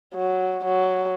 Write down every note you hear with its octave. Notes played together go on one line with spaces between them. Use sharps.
F#3
F#3